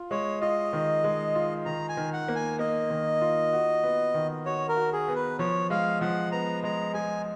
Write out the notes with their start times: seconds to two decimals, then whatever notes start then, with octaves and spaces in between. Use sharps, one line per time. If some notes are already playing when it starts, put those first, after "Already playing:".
Already playing: F4
0.11 G#3 C#5
0.41 F4 D#5
0.73 D#3
1.04 G#3
1.35 F4
1.65 D#3 A#5
1.89 G#5
1.97 D#3
2.13 F#5
2.28 A#3
2.36 G#5
2.59 A#3 D#5
2.90 D#3
3.21 F4
3.53 F#4
3.84 B3
4.14 D#3
4.46 F#4 C#5
4.69 A#4
4.77 F#4
4.93 G#4
5.08 B3
5.15 B4
5.39 F3 C#5
5.70 G#3 F5
6.01 F3 F#5
6.32 B3 A#5
6.64 G#3 A#5
6.94 G#3 G#5